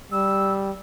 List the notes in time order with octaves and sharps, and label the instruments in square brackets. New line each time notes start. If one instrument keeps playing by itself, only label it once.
[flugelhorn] G3 [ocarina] E6